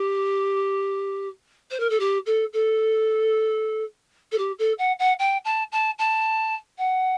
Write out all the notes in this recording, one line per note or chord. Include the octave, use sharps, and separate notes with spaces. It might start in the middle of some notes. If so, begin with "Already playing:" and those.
Already playing: G4
C5
A#4
A4
G4
A4
A4
A4
G4
A4
F#5
F#5
G5
A5
A5
A5
F#5